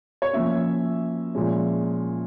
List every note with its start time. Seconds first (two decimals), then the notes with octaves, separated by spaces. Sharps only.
0.22 C#5
0.33 F3 A#3 C#4 E5
1.35 A#2 F3 G#3 C#4